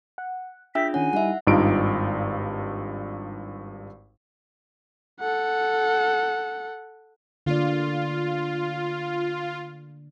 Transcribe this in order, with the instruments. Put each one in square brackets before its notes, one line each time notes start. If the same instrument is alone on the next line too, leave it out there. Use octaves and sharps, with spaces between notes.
[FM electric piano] F#5
[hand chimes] D4 F4 G#4 [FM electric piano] E5 G5 E6 [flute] B6
[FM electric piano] D#3 C#4 [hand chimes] F#5 [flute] G#5
[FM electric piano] G3 D#4 E4 [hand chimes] E5 F#5
[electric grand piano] G#1 G2 D#4 F4 D7
[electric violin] A4 F#5
[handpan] D3 A#3 D5 [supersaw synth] F4